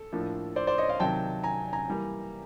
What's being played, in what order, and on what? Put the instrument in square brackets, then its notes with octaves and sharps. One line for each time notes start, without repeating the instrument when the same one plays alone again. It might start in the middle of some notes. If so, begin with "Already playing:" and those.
Already playing: [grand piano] A4
A2 F3 A#3 D4
C5 D5
C5 D5
C#5 D#5
D#5 F5
C3 D#3 F#3 G5 A5
G#5 A#5
G#5 A#5
E3 G3 A#3